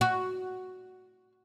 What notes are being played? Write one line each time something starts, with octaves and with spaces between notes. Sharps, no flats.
F#4